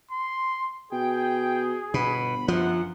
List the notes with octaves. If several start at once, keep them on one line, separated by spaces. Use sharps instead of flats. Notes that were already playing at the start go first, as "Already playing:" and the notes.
C6
B2 G#4 G5
G1 B2 B5
F#2 F3 F#5